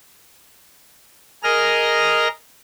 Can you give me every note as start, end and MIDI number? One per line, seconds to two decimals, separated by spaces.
1.43 2.28 68
1.43 2.28 70
1.43 2.28 75
1.43 2.28 89